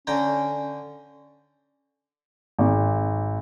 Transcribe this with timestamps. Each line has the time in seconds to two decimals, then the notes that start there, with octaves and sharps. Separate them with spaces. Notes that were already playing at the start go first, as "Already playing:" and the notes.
0.07 D3 C#4 G5 A#5
2.59 G#1